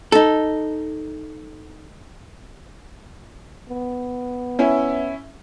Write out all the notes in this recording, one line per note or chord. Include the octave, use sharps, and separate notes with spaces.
D#4 A4
B3
C#4 E4 E5